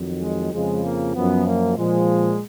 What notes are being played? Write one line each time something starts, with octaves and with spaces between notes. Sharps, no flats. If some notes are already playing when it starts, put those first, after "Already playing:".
Already playing: F2 D#3 F#3
G#3
F2 C#3 F3 G#3
A#3
F#2 F3 B3
A#3
A#2 F3 G#3